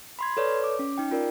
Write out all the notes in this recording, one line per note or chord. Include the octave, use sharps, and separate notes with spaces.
B5 C6 G#6
A4 B4 C#5 D5
D6
C#4
D#4 G5
F4 A#4 D5